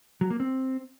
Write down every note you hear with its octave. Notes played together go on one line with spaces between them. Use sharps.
F#3
A#3
C4